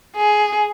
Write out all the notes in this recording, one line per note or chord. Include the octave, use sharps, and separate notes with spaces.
G#4